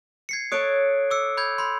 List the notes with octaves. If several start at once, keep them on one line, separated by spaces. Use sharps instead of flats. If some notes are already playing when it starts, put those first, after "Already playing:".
G#6 C7 C#7
A4 C#5 D#6 F#6 D7
D6 E6 C#7
B5 G6 G#6
B5 C6